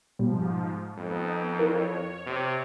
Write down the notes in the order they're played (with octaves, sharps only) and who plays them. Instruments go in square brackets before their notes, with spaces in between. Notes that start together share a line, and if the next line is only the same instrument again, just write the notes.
[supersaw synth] G#2 F3 [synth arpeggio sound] B2 G3
[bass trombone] F2 [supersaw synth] B3 D#4
[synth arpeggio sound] E3 A#4 [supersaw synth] C#5
[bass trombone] C3